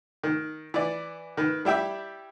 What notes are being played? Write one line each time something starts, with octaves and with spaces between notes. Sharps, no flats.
D#3
E3 D5
D#3 B4
G3 E4 G4 E5